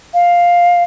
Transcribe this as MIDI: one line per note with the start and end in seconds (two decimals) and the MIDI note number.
0.14 0.83 77